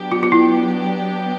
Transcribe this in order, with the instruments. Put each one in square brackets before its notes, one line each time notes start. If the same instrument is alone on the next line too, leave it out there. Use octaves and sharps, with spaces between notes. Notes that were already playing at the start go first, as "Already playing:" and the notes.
Already playing: [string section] F#3 B3 D4 G4
[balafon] F4
F4
E4